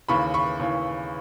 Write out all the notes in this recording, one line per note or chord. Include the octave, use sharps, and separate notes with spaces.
D#2 C#3 E3 B5 C#6
B5 C#6
D#2 C#3 E3